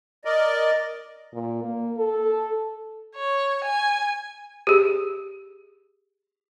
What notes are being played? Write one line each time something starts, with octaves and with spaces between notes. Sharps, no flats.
A#4 D5 D#5
A#2
A#3
A4
C#5
G#5
G4 G#4